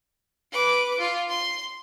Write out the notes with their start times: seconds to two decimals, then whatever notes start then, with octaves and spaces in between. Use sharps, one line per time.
0.52 B4 D6
0.99 F4
1.29 C6